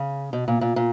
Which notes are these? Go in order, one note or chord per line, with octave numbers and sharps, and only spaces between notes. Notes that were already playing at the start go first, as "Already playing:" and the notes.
Already playing: C#3
B2
A#2
A#2
A#2